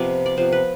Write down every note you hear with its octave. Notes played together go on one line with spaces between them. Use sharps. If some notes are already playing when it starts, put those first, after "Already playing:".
Already playing: C3 F3 B3 D5
D5
C3 F3 B3 C5
B4